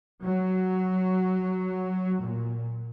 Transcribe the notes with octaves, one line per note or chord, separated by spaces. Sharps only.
F#3
A#2